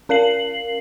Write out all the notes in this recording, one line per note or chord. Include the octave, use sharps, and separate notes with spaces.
C#4 A#4 F5 C7 F#7